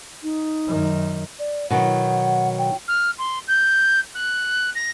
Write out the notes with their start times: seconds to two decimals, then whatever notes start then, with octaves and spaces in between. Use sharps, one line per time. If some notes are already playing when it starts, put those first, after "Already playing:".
0.23 D#4
0.68 F#2 D#3
1.39 D5
1.71 B2 D#3 F#3 F#5
2.59 G5
2.88 F6
3.18 C6
3.48 G6
4.14 F#6
4.75 A#6